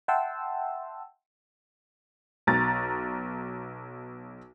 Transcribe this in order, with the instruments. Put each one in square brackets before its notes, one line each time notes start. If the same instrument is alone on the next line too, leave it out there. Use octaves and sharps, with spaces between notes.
[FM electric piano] E5 F#5 G5 A5 C6 E6
[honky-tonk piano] B1 A#5 A6